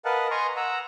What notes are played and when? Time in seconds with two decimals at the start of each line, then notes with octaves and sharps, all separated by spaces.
0.05 A#4 B4 D#5 F5 F#5 A5
0.31 D#5 G#5 A#5 C6 C#6
0.57 F#5 A#5 E6